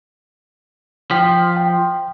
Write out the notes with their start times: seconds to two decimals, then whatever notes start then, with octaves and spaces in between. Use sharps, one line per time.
1.11 F3 G5 B6
1.56 G5